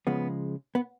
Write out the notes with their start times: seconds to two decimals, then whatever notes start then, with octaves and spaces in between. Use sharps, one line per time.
0.07 C#3 F3 G#3 B3
0.75 B3